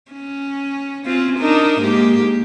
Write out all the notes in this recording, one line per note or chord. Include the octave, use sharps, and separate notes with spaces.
C#4
C4 C#4 F4
D4 D#4 A#4
G#2 A#3 G4